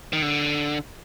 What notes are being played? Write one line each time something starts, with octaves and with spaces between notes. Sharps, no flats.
D#3
D3